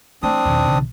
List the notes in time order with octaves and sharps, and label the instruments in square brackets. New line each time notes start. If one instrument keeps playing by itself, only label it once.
[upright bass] E3 A3 [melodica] C4 D4 D#6
[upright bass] B1 D#3 [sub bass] E2
[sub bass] C#3